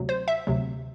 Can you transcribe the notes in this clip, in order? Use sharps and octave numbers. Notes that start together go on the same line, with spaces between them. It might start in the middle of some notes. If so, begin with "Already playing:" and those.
Already playing: D2 C3 F#3
C5
E5
D2 C3 F#3